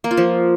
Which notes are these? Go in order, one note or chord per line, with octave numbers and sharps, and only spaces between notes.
A#3
F4
F3